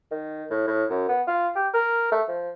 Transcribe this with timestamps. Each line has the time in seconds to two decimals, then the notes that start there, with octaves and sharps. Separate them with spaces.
0.12 D#3
0.50 A2
0.67 A2
0.90 F#2
1.08 B3
1.27 F4
1.56 G4
1.74 A#4
2.12 A3
2.29 F3